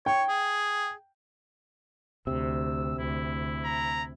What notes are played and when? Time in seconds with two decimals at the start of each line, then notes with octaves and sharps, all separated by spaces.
0.06 C#5 G5
0.29 G#4
2.27 D2 C3 E6
2.99 D2 E4
3.65 A#5